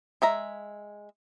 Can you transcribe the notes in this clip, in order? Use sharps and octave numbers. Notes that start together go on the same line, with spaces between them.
G#3 E5 A#5